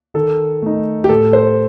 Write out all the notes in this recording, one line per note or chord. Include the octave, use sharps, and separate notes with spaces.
D#3 A4
A3 D#4
G4
A2 A4
C5